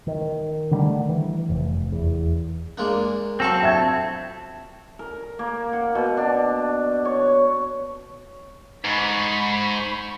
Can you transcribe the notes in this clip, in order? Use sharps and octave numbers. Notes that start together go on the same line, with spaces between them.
D#3
D3 D#3 G3 A3
E3
F1
E2
G#3 A#3 D4
F#3 C4 A4 F5 C#6
E5 A5 G#6
A#4
A#3
F#5
B2
D4
C#5
G#2 B5 C#6 B6